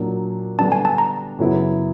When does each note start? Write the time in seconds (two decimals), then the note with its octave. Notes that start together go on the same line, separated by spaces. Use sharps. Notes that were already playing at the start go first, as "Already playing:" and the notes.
Already playing: A#2 F#3 A#3 D4
0.59 D3 G3 B3 D4 A5
0.72 G#5
0.85 A5
0.98 A#5
1.39 F#2 C#3 F#3 B3 E4